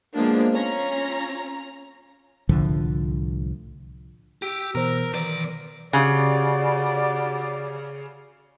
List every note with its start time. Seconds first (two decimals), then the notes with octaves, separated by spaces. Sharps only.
0.13 F3 G#3 A#3 B3 D4
0.54 C#4 F4 A#5
2.49 C2 A2 D3 F3
4.42 G4 E6
4.75 B2 E3 A#4 C5
5.13 B1 D#3 E3 D5 A#6
5.93 C#3 F#4 G4 D5